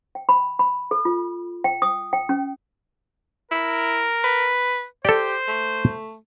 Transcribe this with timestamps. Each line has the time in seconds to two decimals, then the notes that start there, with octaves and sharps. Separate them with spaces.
0.15 G5
0.29 B5
0.59 B5
0.91 A4
1.05 F4
1.64 G5
1.82 D#6
2.13 G5
2.29 C#4
3.51 E4 A#4
4.24 B4
5.05 G4 A4 C5 D5
5.48 A3